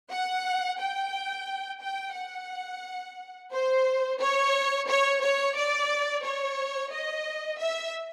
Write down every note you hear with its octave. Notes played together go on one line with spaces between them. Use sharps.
F#5
G5
G5
F#5
C5
C#5
C#5
C#5
D5
C#5
D#5
E5